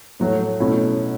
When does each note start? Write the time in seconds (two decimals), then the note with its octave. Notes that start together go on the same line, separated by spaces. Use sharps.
0.20 A2 F#3 A3
0.60 B2 A3 C#4 E4